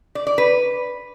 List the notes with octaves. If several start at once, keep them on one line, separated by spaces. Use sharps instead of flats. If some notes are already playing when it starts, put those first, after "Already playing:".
D5
D5
B4